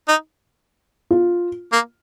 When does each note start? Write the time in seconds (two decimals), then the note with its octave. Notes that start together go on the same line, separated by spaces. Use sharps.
0.08 D#4
1.11 F4
1.72 A#3